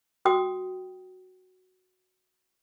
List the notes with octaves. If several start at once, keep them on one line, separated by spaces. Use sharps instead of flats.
F#4 G5 D#6